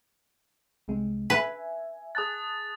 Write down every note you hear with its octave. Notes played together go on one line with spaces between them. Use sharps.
C2 C3 G#3
B4 E5 G#5
G#4 A5 D#6 F#6 A6